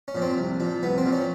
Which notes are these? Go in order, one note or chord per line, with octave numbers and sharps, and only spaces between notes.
C#4
A#2 F3
C4
C2
A#2 F3
C2 B3
C4
A#2 F3
C#4